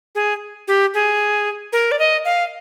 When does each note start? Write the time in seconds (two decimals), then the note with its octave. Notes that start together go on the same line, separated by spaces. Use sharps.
0.15 G#4
0.68 G4
0.94 G#4
1.73 A#4
1.92 D5
1.99 D#5
2.25 F5